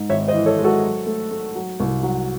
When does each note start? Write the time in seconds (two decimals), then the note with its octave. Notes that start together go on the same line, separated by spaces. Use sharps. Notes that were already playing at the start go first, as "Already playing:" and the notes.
Already playing: G#2
0.09 G#1 C#5 E5
0.28 C5 D#5
0.34 E3
0.46 A4 C#5
0.59 G#3
0.64 F#4 A4
0.83 F#3
1.06 A3
1.31 A3
1.55 F#3
1.80 C2
2.03 F#3